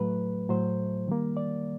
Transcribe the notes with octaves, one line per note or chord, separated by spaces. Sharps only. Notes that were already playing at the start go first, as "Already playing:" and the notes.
Already playing: A2 F#3 A3 B4
A2 F#3 A3 C5
D#3 G3 A#3
D5